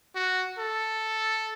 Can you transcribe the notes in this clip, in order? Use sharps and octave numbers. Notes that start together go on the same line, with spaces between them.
F#4
A4